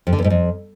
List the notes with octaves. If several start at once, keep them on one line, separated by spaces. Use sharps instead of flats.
F2
D3
E2
G#2
F2